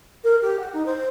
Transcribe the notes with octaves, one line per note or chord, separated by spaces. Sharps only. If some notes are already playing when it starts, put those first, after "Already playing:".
A#4
G4
F#5
D#4
C5